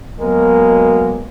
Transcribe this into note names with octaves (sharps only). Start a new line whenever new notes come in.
B2 F#3 G#3 A#3 A#4